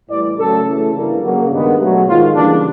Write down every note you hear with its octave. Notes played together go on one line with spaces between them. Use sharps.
A2 E3 G3 D5
C#3 F#3 A3 A4
C#3 E3 A3
G2 E3 G3 A#3
C#3 F#3 A#3
G2 D#3 G#3 B3
B2 F#3 A3
G#2 D#3 G#3 F4
C#3 E3 G3 A#3 D4